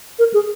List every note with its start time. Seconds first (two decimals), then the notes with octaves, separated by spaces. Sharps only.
0.19 A#4
0.34 G#4